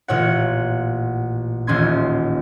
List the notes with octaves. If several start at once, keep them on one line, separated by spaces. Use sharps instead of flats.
A1 A#2 C#5 F#5
D#1 A1 C#4 C6 G#6